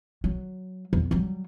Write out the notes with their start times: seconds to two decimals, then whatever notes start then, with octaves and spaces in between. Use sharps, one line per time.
0.24 F#3
0.93 E2
1.11 F#3 G3